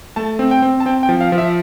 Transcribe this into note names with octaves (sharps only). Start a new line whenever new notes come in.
A3 A5
C4
G5
C4
A5
C4 G5
G5
F3
F5
F3
E5